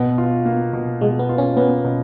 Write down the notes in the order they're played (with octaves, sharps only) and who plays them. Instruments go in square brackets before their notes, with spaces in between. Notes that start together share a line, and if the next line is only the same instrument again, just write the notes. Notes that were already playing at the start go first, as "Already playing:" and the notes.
Already playing: [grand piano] B2 [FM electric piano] B3
[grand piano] F4
A#3
B2
[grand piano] B2 [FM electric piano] G#3
[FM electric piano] B3
[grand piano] F4
[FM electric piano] C#4
[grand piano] A#3 [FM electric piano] B3
[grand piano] B2